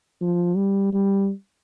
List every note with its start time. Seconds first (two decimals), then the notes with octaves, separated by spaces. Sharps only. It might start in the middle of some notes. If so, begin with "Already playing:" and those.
0.21 F3
0.57 G3
0.93 G3